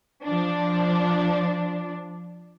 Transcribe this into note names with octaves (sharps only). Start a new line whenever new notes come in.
F3 D4